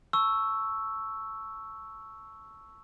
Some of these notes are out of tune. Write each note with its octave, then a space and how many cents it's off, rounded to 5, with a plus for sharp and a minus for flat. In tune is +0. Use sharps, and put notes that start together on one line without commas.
A5 +0 C#6 +0 E6 +0